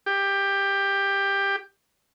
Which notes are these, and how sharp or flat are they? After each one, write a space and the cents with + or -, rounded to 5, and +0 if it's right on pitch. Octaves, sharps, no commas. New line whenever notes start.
G4 +15